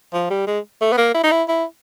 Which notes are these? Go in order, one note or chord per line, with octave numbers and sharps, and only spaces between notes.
F3
G3
G#3
A3
B3
A#3
E4
D#4
E4
E4